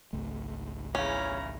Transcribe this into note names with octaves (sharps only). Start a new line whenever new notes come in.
G#1 C#2 A3
E2 C#3 C#4 E4 A#5